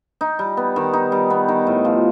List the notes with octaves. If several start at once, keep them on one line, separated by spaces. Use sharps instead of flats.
D#4
G3
B3
D#3
D#4
G3
B3
D#3
A2
F3